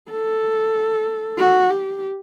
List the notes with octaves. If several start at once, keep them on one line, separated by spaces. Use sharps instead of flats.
A4
F#4
G4